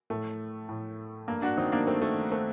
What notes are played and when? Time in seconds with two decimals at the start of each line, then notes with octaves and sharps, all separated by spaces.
0.10 A2 A3
0.69 A2
1.28 G2 A#3
1.42 D4 F#4
1.57 D#3 C4 D#4
1.72 A#3 D4
1.87 G2 A3 C4
2.02 A3
2.17 D#3
2.31 A3 C4